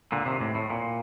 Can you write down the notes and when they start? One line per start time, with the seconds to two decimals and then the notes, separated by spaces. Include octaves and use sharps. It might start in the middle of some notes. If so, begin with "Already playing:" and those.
0.12 A#2 D3
0.26 C3 D#3
0.41 A2 C3
0.55 A2
0.70 A#2